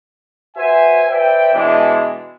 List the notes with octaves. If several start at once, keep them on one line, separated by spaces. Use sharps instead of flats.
F#4 B4 C5 E5 G#5
B4 C5 D5 E5 G5
B2 E3 G#3 D4